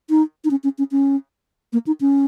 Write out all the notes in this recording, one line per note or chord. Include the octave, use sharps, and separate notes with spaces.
D#4
D#4
C#4
C#4
C#4
C#4
A#3
D#4
C#4